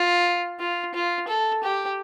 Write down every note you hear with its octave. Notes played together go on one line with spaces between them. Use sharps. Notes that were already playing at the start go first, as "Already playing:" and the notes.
Already playing: F4
F4
F4
A4
G4